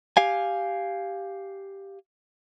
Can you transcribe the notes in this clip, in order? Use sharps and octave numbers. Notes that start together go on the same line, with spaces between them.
G4 F5 G#5